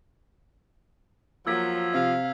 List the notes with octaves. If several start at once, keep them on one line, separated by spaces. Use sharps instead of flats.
F3 F#3 A#3 E6 G#6 B6
C3 F5